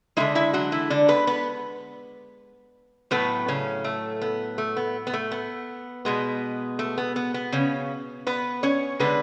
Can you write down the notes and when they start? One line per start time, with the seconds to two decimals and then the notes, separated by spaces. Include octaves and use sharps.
0.17 D3 G#3 E4 E5
0.35 E4 E5
0.53 F#3 F#4
0.72 E3 E4
0.90 D3 D4
1.08 B3 B4
1.27 B3 B4
3.11 A2 F#3 A3 B3 B4
3.48 C#3 C#4
3.84 A3
4.21 B3
4.58 A3
4.76 B3
5.07 B3
5.13 A3
5.31 B3
6.05 B2 G#3 B3
6.79 A3
6.98 B3
7.16 B3
7.34 B3
7.52 C#3 C#4
8.27 B3 B4
8.63 C#4 C#5
9.00 D3 G#3 B3 B4